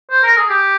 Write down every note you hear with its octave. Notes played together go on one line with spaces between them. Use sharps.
C5
A#4
G#4
G4